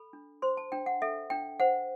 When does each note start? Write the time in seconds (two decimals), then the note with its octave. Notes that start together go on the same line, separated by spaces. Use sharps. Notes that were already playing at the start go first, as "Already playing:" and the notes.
Already playing: A4 B5
0.13 D4
0.42 C5 C6
0.57 A5
0.72 D4 G5
0.86 F#5
1.02 A4 E5
1.30 D4 G5
1.60 C5 F#5